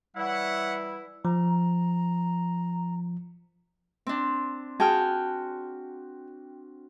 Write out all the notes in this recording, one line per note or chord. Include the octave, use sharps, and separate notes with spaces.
E3 G3 E4 C#5 E5 F#5
F3 A#5
C4 D4
F#4 G#4 G5 A5 F6